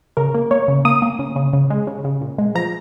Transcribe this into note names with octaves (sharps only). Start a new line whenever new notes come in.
C#3 A#4
A#3
A#3 C#5
C#3
A#3 D#6
A#3
C#3
C#3
C#3
G#3
C#3
C#3
A#2
G#3
F3 A#5